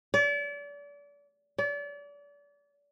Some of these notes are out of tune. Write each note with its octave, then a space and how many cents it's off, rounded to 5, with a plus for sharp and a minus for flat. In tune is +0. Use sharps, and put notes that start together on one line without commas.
D5 -35
D5 -35